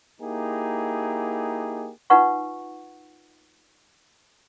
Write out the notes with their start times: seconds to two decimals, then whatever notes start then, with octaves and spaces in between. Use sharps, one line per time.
0.21 A#3 D#4 E4 G4 G#4
2.10 D#4 F4 B4 F#5 C#6